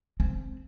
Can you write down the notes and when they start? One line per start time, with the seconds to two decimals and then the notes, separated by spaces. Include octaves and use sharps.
0.20 C4